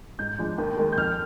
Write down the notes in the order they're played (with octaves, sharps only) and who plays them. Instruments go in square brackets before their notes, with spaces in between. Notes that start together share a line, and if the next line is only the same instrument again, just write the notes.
[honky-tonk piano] G#2 G6
F3 G#3 D4
D#2
D#3 G#3
G6
F2 F6